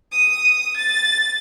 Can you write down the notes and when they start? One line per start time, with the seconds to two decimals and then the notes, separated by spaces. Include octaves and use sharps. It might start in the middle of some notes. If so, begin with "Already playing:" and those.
0.12 D#6
0.76 A6